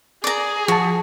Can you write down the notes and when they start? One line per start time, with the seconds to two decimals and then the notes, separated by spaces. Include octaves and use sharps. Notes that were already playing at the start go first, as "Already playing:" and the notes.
0.24 G#4 D5 A#5
0.68 F3 F#4 A5